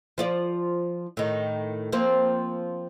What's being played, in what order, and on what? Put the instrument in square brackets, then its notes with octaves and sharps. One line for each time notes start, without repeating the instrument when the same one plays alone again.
[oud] F3 F4 D5
A2 D#3
F3 A#3 C4